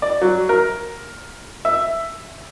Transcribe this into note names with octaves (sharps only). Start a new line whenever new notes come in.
D5
F#3
A#4
E5